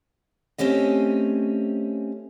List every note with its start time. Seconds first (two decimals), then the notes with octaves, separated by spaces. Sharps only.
0.58 A3 C4 C#4 G4 D#5